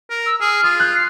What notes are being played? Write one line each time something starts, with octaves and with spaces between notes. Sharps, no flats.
A#4
E6
G#4 F6
F4 D#6
F#6 G6
C7